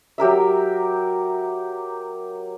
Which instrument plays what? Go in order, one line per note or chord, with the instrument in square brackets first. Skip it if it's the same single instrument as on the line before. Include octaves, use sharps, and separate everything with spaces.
[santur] F#3 G4 A#4 E5